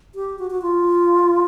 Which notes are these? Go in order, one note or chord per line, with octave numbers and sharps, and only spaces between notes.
G4
F#4
F#4
F4